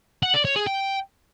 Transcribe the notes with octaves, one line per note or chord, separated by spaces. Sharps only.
F#5
D5
C#5
G#4
G5